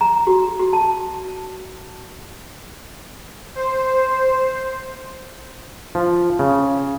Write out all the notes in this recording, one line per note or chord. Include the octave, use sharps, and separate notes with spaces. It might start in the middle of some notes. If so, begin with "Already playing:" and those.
A#5
F#4
F#4
A5
C5
F3
C#3